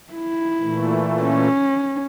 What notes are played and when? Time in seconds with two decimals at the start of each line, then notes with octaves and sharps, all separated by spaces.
0.13 E4
0.61 A#2 E3 A3
1.23 C#4